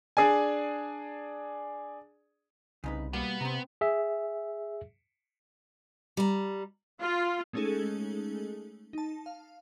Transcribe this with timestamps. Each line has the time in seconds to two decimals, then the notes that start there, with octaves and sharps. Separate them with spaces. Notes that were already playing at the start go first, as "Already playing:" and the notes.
0.17 D4 G#4 D5 G#5
2.84 C2 C#3 D#4 B4
3.13 B2 G3 A#3 B3
3.41 C3 C4 A#5
3.81 G#4 E5
6.17 G3 A#5
7.00 F4
7.53 G#3 A3 C#4 D#4 G#4 A4
8.93 D#4 A5
9.26 F5